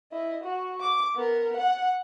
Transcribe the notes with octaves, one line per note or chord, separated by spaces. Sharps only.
E4 D#5
F#4
D6
B3 A#4
F#5